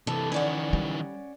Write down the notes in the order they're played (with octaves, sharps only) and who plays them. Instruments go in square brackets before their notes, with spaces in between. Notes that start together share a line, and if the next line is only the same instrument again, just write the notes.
[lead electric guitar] C3 E3 [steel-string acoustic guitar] A4
[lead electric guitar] D#3 E3 [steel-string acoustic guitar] C#4 D5 F#5
[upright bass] G3